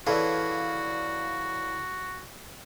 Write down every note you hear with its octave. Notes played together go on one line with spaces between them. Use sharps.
E3 F#4 G#4 A4 B4 C#5 D5 F5